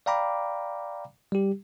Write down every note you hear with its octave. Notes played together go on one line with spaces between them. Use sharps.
D5 F5 G5 A#5 B5 D6
G3 G4